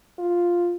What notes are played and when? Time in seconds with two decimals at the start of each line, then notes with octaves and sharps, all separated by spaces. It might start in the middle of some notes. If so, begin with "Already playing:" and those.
0.19 F4